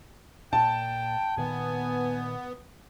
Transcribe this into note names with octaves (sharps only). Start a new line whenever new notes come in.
A#2 G5 A5
A#2 D#3 B3 G#5